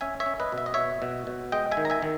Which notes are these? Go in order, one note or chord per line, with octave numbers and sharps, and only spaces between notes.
C#4 E5 G#5
C#5 E5
C#4
B4 D#5
B2
E5
D#5
B2 C#5 E5
B2
B2
G#3 D#5 G5
E5 G#5
D#3
A#5
E5 G#5
D#3